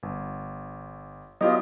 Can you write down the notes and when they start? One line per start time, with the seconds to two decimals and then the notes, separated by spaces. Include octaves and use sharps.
0.03 G1
1.41 F#3 B3 E4 F4 G4 D#5